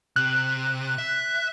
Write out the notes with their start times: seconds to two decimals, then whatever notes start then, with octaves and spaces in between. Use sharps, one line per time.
0.16 C3 F#6
0.98 E5